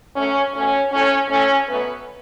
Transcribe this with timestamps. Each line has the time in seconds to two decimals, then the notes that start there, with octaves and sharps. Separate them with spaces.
0.16 F#2 F#3 A3 C#4
0.54 B2 A3 C#4
0.92 A2 A3 C#4
1.29 A2 A3 C#4
1.67 B2 F#3 A3 B3 B4